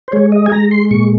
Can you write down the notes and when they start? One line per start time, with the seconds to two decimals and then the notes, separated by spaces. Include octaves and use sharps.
0.08 C5
0.12 G#3 C#5
0.32 D#5
0.46 G#5
0.52 G#3 A#5
0.71 C6
0.91 A#2 C#6